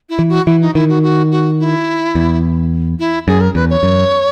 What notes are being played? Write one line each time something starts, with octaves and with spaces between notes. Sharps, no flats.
E4
E3
F#4
E3 E4
D#4
D#3 E4
F#4
F#4
F#4
E4
E2
E4
F#2 G#4
A#4
E2 B4
C#5
F#2